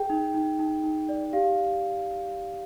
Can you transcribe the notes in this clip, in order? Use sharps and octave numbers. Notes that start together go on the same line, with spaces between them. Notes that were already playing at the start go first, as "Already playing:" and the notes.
Already playing: G#4 G5
D#4
D#4
D#4
D#4
D5
G4 F5